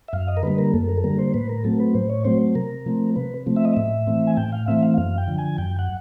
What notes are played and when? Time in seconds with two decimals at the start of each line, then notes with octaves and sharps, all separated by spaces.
0.08 E5
0.13 F#2 F5
0.28 D#5
0.37 A#4
0.43 D3 G3 A#3 B4
0.58 A#4
0.74 F#2 A4
0.89 A#4
0.97 A4
1.04 D3 G3 A#3 A#4
1.19 C5
1.34 A2 B4
1.49 A#4
1.64 F#3 A3 C4 A4
1.80 B4
1.94 A2 C5
2.09 C#5
2.24 F#3 A3 C4 C5
2.55 C3 A#4
2.86 F3 A3 C4
3.16 C3 B4
3.46 F3 A3 C4
3.56 E5
3.65 D#5
3.74 A2 E5
4.07 E3 A3 C4
4.27 G#5
4.37 A2 G5
4.52 F5
4.68 E3 A3 C4 E5
4.83 F5
4.98 F#2 F5
5.18 G5
5.28 D3 F3
5.38 G#5
5.58 F#2 G5
5.79 F#5